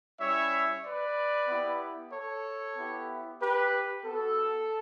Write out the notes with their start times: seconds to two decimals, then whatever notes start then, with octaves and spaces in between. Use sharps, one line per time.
0.20 G3 C#4 E4 C#5 E5
0.84 B4 D5
1.49 B3 E4 G4
2.12 A4 C#5
2.77 B3 E4 G4
3.41 G4 B4
4.05 B3 F#4 A4